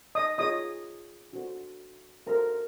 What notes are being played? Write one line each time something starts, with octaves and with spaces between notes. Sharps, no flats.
D#5 D#6
F4 G#4 C#5 D#5 D#6
D4 F#4 A4 C5
D4 F#4 A4 A#4 C5 A#5